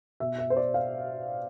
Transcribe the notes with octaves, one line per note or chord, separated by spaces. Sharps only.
B2 E5
E5
C5
D5
F5